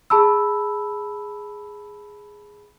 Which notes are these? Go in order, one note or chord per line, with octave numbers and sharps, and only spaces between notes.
G#4 A5 B5 E6